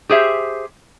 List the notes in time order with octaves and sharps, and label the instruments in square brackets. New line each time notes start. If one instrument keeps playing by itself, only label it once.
[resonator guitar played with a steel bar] G4 G#4 C5 E5